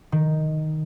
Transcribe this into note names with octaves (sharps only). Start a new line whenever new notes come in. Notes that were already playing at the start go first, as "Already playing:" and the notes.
D#3